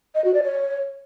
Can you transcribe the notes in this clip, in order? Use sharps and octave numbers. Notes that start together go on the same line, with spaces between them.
D#5
F#4
D5
C#5